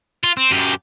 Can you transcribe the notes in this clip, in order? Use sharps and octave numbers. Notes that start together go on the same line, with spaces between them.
F4
C4
F#2 G4